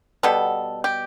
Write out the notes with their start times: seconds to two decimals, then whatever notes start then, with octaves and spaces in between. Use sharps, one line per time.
0.23 B2 G3 B3 A4
0.84 G4